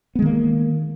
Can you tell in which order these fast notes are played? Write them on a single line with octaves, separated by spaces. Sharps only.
B3 G#3 D#3 A#3